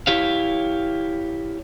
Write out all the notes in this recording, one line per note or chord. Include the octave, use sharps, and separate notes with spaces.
E4 G4 C#5 F5